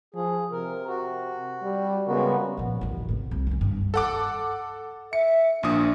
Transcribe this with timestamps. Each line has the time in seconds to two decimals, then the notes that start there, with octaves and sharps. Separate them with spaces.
0.14 F3 G#4
0.52 C3 A#4
0.88 F#4
1.63 G3
2.07 C#3 G3 G#3 B3 F#4 A#4
2.57 A#2 F3
2.81 A1 D2
3.09 A2 C3
3.31 C2
3.47 D#3 C#4
3.61 G2
3.94 A4 F#5 D6
5.13 E5 C#7
5.63 A#1 A#2 D4 D#6